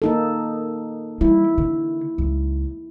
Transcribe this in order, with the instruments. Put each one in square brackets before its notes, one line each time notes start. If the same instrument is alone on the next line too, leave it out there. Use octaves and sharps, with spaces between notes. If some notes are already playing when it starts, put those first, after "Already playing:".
[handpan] A#3 D#4 A4
[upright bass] G3 [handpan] E4
[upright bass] D3
C#2